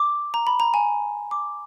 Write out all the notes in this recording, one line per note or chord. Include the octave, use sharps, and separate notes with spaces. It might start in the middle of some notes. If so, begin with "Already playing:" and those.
Already playing: D6
A#5
B5
A#5
G#5
D6